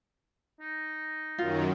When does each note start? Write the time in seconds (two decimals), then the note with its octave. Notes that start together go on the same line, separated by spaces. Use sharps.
0.60 D#4
1.38 F#2 D#3 F#3 F4